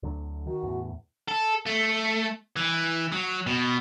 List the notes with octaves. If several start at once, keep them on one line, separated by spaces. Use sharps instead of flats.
D2 D3 F#3
D#3 F#4
E2 A2
A4
A3
E3
F#3
B2